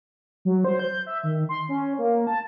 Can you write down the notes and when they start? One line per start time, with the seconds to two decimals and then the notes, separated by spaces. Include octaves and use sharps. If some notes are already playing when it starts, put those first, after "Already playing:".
0.45 F#3
0.64 C5
0.79 G6
1.07 E5
1.23 D#3
1.49 C6
1.69 C#4
1.98 A#3
2.27 A5